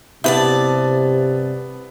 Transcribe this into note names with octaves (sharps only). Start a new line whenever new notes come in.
G2 C3 B3 E4 D5 A5